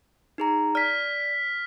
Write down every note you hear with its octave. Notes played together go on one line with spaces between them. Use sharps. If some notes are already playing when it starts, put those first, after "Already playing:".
D#4 G#4 A#5
D5 F6 B6